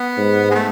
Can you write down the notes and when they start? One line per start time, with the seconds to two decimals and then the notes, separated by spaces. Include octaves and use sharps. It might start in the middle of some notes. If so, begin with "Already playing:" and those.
Already playing: B3
0.17 G#2
0.51 G#3
0.55 A3